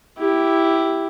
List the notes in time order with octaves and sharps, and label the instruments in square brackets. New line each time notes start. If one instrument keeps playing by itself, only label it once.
[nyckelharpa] E4 G4